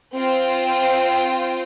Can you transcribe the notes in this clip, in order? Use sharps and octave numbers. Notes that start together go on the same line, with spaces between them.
C4 F4 C5 G5